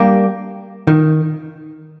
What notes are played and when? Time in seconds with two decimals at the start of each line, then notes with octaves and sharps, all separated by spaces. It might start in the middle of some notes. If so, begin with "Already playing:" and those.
Already playing: G3 A#3 D4 G4
0.87 D#3